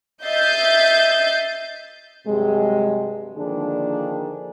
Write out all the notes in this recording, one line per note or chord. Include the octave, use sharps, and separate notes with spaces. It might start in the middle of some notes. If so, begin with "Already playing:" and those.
D#5 E5 G6 A6 C7
G2 C3 F#3 G#3
D3 D#3 F3 A#3 D4 G#4